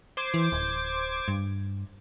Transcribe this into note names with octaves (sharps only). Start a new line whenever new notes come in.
C5 D6 G#6
E3
D1
G2